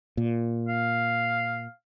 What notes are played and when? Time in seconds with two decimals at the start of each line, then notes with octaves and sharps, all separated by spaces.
0.17 A#2
0.68 F5